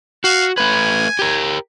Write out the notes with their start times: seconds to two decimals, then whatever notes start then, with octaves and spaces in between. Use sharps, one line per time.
0.24 F#4 F5
0.58 A3 B4 G#5
1.19 G4 A#4